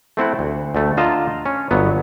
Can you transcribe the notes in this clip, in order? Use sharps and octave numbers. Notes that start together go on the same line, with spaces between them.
A3 C4 E4 F#5
D2
D2 A3
D3 F4 D#5 A5 A#5
C#4
G1 F#3 B3